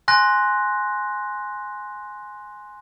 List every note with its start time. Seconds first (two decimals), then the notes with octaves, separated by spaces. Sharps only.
0.08 G#5 C6 F#6 A#6